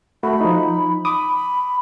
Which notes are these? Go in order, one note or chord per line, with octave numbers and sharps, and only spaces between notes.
A3 F#4 B5
F3 D#4
B5 D6 D#6